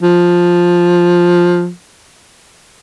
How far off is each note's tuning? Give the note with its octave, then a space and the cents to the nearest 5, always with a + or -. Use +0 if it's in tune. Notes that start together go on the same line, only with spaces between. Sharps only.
F3 +5